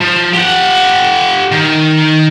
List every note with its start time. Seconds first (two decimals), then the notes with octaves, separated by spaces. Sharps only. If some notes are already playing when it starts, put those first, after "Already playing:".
0.01 F3
0.34 G4 F#5
1.52 D#3